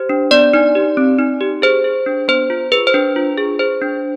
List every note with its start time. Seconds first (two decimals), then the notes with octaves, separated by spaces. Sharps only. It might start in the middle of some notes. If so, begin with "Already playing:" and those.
Already playing: G4 C5
0.09 D4
0.31 B3 D5
0.53 D#4
0.75 G4
0.97 C4
1.19 D#4
1.41 G4
1.62 G#4 C5
1.84 G#4
2.06 D4
2.28 B3 C5
2.50 F4
2.72 G#4 B4
2.87 C5
2.94 D4 B4
3.16 F4
3.38 G#4
3.59 G#4 C5
3.82 D4